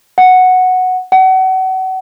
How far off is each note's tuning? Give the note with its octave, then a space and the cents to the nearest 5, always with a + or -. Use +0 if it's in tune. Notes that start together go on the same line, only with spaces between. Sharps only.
F#5 -5
F#5 +30